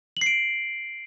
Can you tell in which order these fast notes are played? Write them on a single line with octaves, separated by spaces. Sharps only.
F#7 C7 D7